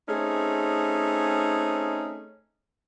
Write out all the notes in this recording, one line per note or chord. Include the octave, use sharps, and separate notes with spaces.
A3 C4 C#4 D#4 G#4